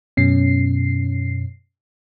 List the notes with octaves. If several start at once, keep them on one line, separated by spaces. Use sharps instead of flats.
F#2 B2 C#4 C7